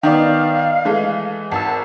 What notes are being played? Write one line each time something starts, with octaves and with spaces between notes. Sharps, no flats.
D#3 B3 D5 F5
E3 G#3 A3
G#1 A5 E6